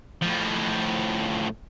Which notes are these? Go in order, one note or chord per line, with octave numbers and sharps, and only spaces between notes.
A2 F3